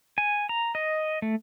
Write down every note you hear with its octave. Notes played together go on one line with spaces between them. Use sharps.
G#5
A#5
D#5
A3